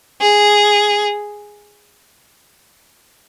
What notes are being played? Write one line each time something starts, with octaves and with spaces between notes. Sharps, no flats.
G#4